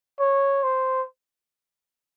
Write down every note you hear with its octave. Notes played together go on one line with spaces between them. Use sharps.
C#5
C5